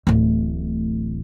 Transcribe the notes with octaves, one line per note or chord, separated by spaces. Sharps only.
D1 A1